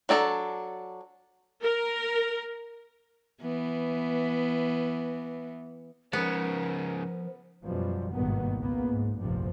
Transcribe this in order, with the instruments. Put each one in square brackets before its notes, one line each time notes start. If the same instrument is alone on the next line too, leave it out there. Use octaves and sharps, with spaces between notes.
[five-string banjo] F#3 D4 A4 A#5
[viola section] A#4
[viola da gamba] E3 B3
[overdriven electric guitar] G#2 C#3 [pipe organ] F3 [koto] B3 [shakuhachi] A#4
[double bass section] F#2 B2 F3 G3
G#1 G2 B2 D#3 A#3 B3
C#2 A#3 B3
G#2
F1 A#1 G2 C3 F3